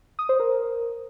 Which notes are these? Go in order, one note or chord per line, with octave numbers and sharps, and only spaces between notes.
D#6
C5
A#4